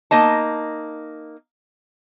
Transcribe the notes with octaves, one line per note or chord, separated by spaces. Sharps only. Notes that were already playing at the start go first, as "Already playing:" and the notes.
A#3 D#4 D#5 A5